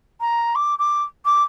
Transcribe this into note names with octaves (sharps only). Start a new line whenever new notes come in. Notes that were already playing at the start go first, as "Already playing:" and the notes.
A#5
D6
D6
D6